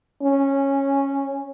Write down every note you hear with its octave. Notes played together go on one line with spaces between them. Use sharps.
C#4